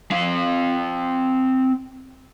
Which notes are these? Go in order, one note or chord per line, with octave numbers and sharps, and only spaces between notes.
C4 F5